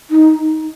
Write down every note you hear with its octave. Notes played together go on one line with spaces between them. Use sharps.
D#4